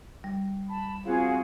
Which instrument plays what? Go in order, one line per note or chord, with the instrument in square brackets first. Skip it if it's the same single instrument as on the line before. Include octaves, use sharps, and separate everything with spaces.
[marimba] G3
[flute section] A5 B5
[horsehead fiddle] C4 F4 [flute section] F#4 G#4 F5